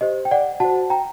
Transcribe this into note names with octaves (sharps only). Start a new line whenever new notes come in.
G4 C5 D#5
G5
D5 F#5
F#4 C5 F#5 A5
G5 A#5